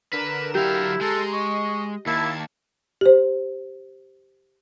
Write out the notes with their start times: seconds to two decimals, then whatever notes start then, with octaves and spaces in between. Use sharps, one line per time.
0.13 D3 A#4 B4 E7
0.55 F#3 E4 G4 F5
1.01 G#3 A4 A#5 C6
1.33 D#5 C#6
2.06 D#2 A#3 E4 A5 G#6
3.01 G4 C5